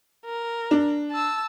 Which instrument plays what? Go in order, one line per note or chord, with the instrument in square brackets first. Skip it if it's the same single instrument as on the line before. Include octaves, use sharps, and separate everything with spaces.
[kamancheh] A#4
[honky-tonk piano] D4
[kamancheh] A5 E6